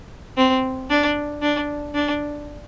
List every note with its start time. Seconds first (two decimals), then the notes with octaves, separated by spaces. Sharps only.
0.37 C4
0.90 D4
1.42 D4
1.94 D4